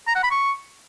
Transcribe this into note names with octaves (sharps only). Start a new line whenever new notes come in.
A#5
F#5
B5
C#6